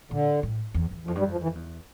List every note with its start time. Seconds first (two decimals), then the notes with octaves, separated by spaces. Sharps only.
0.11 A#2 D3
0.43 A2
0.74 E2
0.91 E2
1.07 F2 F3
1.15 G2 G3
1.24 F2
1.32 F3
1.43 E3
1.55 E2